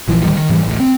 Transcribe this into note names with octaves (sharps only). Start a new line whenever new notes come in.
A#1 E3 F3
A1 D2 D#3 G3
D#3
G#2 E3 F3 G3
A1 D2
C4